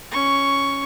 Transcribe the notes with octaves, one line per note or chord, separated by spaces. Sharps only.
C#4 C#6